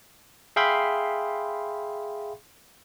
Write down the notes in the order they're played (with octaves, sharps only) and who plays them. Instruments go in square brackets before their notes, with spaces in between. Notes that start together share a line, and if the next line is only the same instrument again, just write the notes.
[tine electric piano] G#4 E5 F5 G5 B5 C6